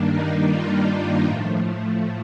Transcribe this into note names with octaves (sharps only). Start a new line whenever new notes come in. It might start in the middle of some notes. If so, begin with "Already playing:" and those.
Already playing: G2 D#3 G3 A#3 D4
D#4
F4
A2 F3 A3